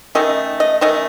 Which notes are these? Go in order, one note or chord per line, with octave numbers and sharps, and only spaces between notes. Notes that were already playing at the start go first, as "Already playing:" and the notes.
D#3 A3 C#4 D#5
D#5
D#3 A3 C#4 D#5